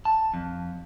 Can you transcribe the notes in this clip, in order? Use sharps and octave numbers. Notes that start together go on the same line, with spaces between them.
A5
F2